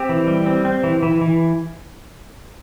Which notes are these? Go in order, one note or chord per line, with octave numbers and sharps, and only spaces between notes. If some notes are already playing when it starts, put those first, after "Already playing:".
Already playing: C4 G4
E3
G3
C4
C4
E3
E3
E3